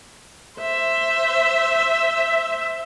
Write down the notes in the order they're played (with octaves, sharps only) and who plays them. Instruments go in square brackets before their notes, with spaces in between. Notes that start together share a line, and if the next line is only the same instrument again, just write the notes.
[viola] C5 E5